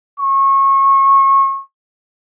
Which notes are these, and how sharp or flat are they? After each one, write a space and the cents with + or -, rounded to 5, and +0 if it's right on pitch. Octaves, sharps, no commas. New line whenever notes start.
C#6 -30